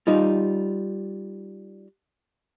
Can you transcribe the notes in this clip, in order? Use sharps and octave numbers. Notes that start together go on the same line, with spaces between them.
G3 D#4 F4